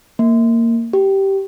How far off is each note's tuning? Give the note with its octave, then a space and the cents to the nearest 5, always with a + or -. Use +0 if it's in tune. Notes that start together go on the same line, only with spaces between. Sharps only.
A#3 -15
G4 -10